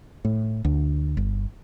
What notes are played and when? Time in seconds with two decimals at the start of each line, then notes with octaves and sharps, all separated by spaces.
0.25 A2
0.65 D2
1.17 G1